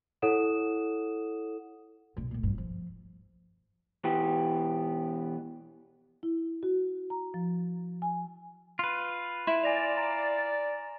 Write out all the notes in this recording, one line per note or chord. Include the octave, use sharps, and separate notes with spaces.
E4 A4 C#5 F#5 D#6 E7
B1 A#2
D2 A#2
A1 G2
F3
B2 E3 B3 G4
E4
F#4
A#5
F3
G#5
F4 B4
E4 C6 E7
D5 G#5 A#6 F7
A#5